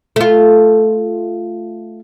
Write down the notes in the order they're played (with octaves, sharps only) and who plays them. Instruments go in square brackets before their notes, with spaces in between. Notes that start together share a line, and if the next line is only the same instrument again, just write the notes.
[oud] A3 F4